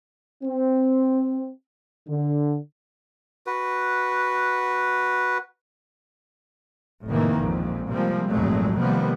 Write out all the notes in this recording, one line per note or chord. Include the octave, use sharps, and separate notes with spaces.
C4
D3
F#4 B4
F1 F2 A2 D#3 E3 A#3
A#1 F2 G#2
C3 F3 G3 G#3 A#3 C4
G#1 F2 A#2 F#3 G#3 A3
C3 D#3 F3 G3 A#3 B3